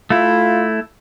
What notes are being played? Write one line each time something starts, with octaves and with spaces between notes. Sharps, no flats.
A3 E4 F4